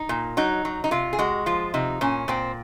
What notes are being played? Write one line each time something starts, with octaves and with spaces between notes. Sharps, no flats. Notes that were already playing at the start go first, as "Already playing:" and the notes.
Already playing: D#4
A#2
F#3 D#4
F#3
D#4
C3 F4
G#4
G#3 F#4
F3 F4
C3 D#4
A#2 C#4
A#2 C4